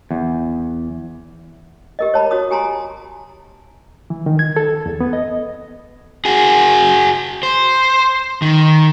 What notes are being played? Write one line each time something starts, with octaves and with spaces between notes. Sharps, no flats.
E2
G4 A#4 D#5
C#5 A5 B5
F#4 C#5 D#6
G4 G#5 A#5 C6
E3
D#3
G#6
A4
E2
B3
D#5
F#4 G#4
C5
D#3